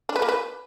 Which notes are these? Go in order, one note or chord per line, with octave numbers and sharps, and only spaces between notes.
D4
B4
A#3
B4